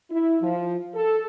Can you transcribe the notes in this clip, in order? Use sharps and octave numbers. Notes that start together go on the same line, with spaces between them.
E4
F3
A4